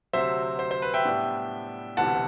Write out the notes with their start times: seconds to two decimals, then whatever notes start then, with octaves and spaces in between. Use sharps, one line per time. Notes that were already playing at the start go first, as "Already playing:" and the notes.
0.13 D2 C3 F#3 C5 E5
0.59 C5
0.71 C5
0.82 B4
0.94 E5 G5
1.05 A2 G3 B3 D4
1.97 E1 D2 C3 E3 F#5 A5